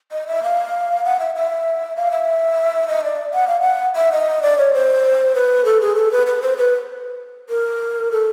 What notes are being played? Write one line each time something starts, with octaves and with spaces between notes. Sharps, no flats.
D#5
E5
F5
F#5
E5
E5
F5
E5
D#5
D5
F#5
F5
F#5
E5
D#5
D5
C#5
C5
B4
A4
G#4
A4
B4
B4
C5
B4
A#4
A4